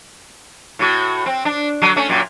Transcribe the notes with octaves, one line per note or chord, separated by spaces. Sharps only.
A2 F#4
C4
D4
D3 F#3 D4
A3 C#4
F#2 A#2